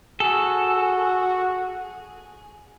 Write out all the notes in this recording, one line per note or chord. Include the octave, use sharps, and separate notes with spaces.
F#4 G#4 A4